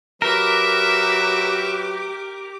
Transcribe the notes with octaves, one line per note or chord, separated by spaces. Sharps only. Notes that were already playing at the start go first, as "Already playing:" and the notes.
F#3 G4 A#4 B4 E5 D6